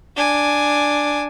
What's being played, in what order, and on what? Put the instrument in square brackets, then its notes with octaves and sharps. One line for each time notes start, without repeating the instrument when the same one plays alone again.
[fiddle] D4 G#5